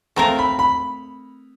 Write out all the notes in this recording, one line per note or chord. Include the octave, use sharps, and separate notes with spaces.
A3 C4 F4 A#4 A#5
B5
B5